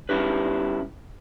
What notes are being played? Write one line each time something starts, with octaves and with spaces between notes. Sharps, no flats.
G3 C#4 E4 G4 B4